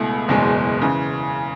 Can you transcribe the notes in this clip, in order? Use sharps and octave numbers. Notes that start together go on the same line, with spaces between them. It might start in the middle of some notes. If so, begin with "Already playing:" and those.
Already playing: C#2 B2 A3 E4
F#1 E2 B2 G#3
C#3 E3